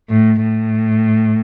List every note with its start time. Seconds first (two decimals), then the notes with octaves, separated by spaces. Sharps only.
0.09 A2
0.42 A2